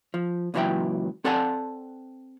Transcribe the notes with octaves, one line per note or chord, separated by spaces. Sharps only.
F3
C#2 A#2 E3 F#3 E5 G5
C4 A4 D5 F#5 G#5 A5